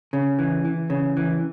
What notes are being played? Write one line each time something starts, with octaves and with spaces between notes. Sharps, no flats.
C#3
E3
E3
C#3
E3